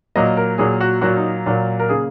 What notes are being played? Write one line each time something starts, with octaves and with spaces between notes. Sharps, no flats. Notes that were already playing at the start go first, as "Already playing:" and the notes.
A#2 F#3 A#3 D#5
A#4
A#2 F#3 A#3 G#4
F#4
A#2 F#3 A#3 F#4
D#4
A#2 F#3 A#3
A#4
C#3 A#3 G#4